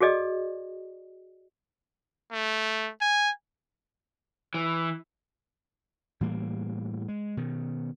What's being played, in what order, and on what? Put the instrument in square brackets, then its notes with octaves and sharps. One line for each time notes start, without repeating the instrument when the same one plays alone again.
[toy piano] F#4 G#4 A4 D5 D#5
[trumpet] A3
G#5
[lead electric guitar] E3
[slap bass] A2 E3 G3 A#3
G#3
B2 D#3